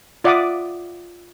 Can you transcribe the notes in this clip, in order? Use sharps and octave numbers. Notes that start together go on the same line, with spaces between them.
F4 D5 E5 F#5 D6 D#6